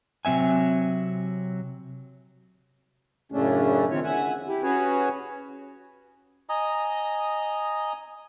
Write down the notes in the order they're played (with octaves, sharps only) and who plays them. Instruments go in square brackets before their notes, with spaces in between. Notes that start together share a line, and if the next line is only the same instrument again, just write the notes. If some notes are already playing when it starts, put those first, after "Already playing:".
[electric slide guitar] C3 F#3 C4 E5 G#5
[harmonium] F#2 A2 C#3 A3 C#4 D4
D#3 C4 F4 C#5
E5 F#5 G#5
E4 G4
C#4 F#4 G#4 B4 C#5
[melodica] D#5 G#5 A#5 D#6